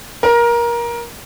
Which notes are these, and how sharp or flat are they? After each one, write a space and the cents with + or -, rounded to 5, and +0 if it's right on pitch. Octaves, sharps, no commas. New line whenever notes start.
A#4 +20